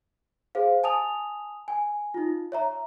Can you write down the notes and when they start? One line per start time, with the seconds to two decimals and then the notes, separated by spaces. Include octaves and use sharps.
0.55 G#4 C5 F5
0.83 G#5 A5 D#6 F7
1.68 G#5
2.14 D#4 F4
2.52 C#5 E5 A#5